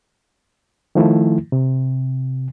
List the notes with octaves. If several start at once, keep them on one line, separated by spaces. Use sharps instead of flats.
D#3 F3 A3 E4
C3